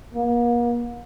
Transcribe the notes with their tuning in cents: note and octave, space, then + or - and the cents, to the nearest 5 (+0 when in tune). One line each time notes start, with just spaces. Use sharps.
A#3 +40